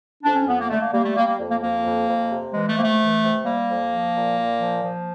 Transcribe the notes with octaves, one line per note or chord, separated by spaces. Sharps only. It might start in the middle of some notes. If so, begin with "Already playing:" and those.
F2 D4
C#4
F2 B3
A#3
D3 A3
A#3
G3 A#3
A3
G3 A#3
A#3
F2
A#3
F2 A#3
F2
F2
C3
E3 G#3
A3
C3 A#3
A3
E3
C3
G3 A#3
F2
F3
A#2
A#2
F3
F3